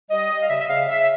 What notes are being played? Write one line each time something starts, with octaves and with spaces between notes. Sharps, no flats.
G3 D#5
G3
F5
C#3 E5
E5
C#3 F5
C#3 E5